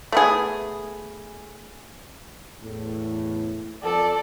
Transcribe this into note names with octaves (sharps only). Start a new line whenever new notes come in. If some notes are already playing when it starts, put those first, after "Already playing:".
A3 B3 G#4
E2 A2
F2 A4 D5